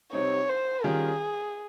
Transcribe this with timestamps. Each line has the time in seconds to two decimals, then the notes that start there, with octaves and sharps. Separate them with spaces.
0.13 C3 G3 C4 D#4 C#5
0.49 C5
0.84 D#3 G3 C#4 F4 G#4